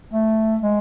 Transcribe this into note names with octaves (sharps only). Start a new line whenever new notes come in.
A3
G#3